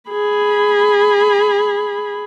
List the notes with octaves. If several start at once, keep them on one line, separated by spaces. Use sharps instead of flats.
G#4 B5